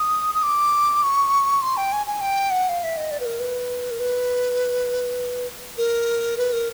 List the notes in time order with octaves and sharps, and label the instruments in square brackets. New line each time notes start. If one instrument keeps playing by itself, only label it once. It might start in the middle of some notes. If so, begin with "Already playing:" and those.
Already playing: [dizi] D#6
D#6
D6
C#6
C6
G5
G#5
G#5
G5
F#5
F5
E5
D#5
D5
B4
A#4
B4
A#4
B4
A#4
B4
A#4